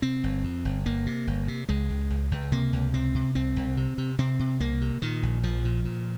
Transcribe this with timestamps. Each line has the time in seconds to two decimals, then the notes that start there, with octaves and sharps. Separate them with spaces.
0.02 C3 C4
0.24 G1
0.44 F2
0.65 G1
0.86 G1 A#3
1.06 C3
1.27 G1
1.48 C3
1.69 C#2 G#3
1.90 C#2
2.10 C#2
2.31 C#2
2.52 C3 A#3
2.73 C#2
2.94 C3 C4
3.15 C3
3.35 C2 C4
3.56 C2
3.77 C3
3.98 C3
4.19 C3 C4
4.39 C3
4.60 C2 A#3
4.81 C3
5.02 A#2 D#3
5.23 A#1
5.43 A#1 F3
5.65 A#2
5.85 A#2